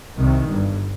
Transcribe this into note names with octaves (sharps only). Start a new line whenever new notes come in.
C2 C3 D#3
G1 G2